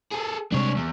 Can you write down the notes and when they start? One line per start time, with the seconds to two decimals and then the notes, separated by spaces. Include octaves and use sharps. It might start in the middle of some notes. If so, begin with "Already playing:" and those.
0.12 G#4 A4
0.52 C3 G3 G#3 D4 C#5
0.76 E2